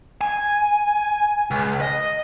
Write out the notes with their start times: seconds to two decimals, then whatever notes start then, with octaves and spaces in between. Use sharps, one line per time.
0.21 G#5
1.51 C#2
1.81 D#5